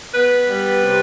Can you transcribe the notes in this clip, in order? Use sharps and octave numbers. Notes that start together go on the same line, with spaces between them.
B3 B4
G3
C3